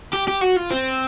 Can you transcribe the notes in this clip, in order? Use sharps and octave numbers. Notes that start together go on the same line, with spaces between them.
G4
G4
F#4
F4
C4